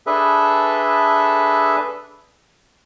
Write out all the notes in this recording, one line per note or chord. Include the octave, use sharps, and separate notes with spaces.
D4 G#4 A4 B4 E5